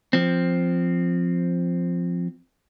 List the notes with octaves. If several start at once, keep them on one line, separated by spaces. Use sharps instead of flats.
F3 C4